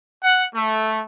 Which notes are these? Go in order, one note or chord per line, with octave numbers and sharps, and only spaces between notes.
F#5
A3